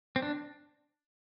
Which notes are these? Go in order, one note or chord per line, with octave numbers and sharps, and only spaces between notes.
C4
D4